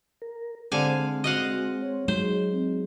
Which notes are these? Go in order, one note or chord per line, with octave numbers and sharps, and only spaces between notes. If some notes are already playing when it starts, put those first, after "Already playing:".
A#4
D3 G#3 C4 C5 F5 G#5
F#4 D#5 F5 F#5
C#5
F#3 G#3 D#4 C5
C4